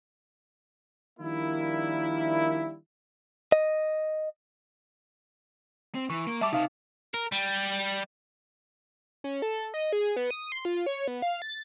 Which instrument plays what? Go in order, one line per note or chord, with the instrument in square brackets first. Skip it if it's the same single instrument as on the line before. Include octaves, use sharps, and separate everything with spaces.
[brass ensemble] D#3 F3 G3 A#3 D4 E4
[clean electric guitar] D#5
[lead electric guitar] C4
[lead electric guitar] E3 [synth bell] C#6
[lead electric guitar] A#3
[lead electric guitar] G3 [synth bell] E5 A5 D6
[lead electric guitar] C3 A5 [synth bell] D#4 F5
[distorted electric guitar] A#4
G3
[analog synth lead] C#4
A4
D#5
G#4
B3
D#6
C6
F4
C#5
B3
F5
A6